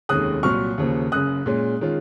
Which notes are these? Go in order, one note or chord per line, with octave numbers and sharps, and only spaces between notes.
F1 D#2 D#3 G#3 C#4 D#6 F#6
C2 A#2 F#3 C#6 F6
D#2 C#3 F3 A#3
F#1 F#2 C#3 D#6 F#6
A#2 G#3 C#4
D#3 G#3 C#4 F4